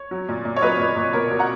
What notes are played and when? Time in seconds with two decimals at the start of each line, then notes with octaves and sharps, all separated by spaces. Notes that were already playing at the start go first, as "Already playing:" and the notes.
Already playing: C#5
0.11 F#3
0.29 A#2
0.45 A#2
0.56 C#5
0.62 F#3 B4 D#5
0.80 A#2
0.96 A#2
1.13 B2 A#4 C#5
1.31 B2
1.39 F#5 A#5